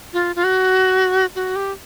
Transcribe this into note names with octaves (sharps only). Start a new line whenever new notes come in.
F4
F4
F#4
F#4
G4